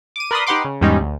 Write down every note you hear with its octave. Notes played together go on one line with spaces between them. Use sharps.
D6 D#7
A#4 B4 D5 B5 C6 D#6
D#4 G4 B4 F#5 C6 D6
C#3
E2 G#2 G3 G#3 C#4 D#4
D2